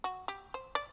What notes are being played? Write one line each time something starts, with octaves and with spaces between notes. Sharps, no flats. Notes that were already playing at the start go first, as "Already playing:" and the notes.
F#4
G4
C5
D5